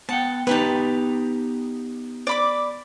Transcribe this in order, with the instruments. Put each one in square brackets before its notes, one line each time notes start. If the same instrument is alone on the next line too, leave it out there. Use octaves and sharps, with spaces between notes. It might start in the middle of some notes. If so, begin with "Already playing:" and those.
[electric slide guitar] B3 F#5 G5 [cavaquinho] A5
[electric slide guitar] B3 D#4 G4 [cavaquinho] B4 G5 A5
[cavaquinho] D5 B5 D6